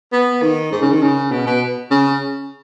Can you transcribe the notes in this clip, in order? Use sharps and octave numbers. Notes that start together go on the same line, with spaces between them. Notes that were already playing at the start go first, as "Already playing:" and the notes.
B3
D#3
G#2
C#3
D#3
C#3
B2
B2
C#3